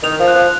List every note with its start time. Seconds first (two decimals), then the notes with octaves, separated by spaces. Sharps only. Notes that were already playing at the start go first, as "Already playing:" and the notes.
0.03 D#3 F7
0.19 F3
0.28 F#6
0.35 F3